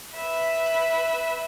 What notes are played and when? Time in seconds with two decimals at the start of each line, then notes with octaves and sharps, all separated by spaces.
0.16 B4 E5